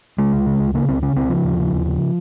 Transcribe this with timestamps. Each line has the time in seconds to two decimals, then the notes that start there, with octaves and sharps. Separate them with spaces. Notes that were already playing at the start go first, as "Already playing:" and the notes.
0.18 C#3 G#3
0.33 C#2
0.46 C#3
0.60 C#2
0.74 C#3 A#3
0.88 C#2 C4
1.02 C#3 C#4
1.16 C#2 C4
1.29 C#3 F3
1.44 D#2
1.58 C#3
1.72 D#2
1.86 C#3